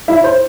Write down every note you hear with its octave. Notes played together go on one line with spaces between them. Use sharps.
E4 E5
C5